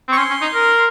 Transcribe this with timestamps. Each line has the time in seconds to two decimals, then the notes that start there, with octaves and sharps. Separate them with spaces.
0.08 C4
0.12 C#6
0.17 C#4 C6
0.30 C#4
0.42 D#4
0.54 A#4